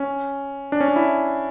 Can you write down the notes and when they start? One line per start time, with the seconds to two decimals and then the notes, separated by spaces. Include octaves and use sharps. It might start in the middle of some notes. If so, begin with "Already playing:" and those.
Already playing: C#4
0.72 D4
0.80 C#4
0.88 D4
0.96 E4